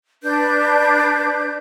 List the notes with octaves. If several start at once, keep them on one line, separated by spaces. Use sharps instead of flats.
D4 B4 G6